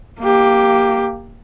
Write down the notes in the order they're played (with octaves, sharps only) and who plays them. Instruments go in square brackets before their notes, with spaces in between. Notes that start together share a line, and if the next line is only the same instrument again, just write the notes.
[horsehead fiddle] A#3 G4